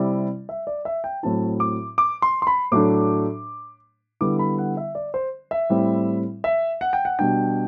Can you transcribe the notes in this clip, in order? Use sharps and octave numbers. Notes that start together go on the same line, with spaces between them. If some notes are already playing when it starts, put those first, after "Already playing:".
Already playing: C3 G3 C4 E4 D5
E5
D5
E5
G5
A2 F#3 C4 E4 A5
D6
D6
C6
C6
B5
A2 F#3 A3 D4 D6
D3 G3 B3 E4 D6
B5
F#5
E5
D5
C5
E5
A2 G3 C4 E4
E5
F#5
G5
F#5
B2 G3 D4 G5